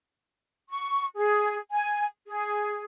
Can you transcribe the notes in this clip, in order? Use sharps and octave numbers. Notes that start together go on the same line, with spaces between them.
C#6
G#4
G#5
G#4